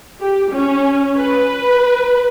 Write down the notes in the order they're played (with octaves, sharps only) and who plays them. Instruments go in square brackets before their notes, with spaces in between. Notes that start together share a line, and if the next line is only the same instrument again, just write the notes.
[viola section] G4
C#4
B4